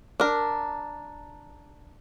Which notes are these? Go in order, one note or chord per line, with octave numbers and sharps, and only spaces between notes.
D4 A#4